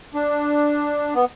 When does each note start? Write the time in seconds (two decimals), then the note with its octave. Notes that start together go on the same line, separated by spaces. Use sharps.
0.14 D4
1.15 B3